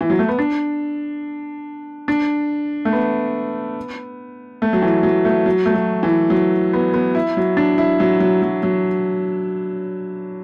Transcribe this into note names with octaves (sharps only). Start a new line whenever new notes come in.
E3
F#3
A3
B3
D4
D4
A3
B3
A3
F#3
E3
F#3
A3
F#3
A3
F#3
E3
F#3
B3
B3
E4
F#3
D4
E4
F#3
F#3
F#3
F#3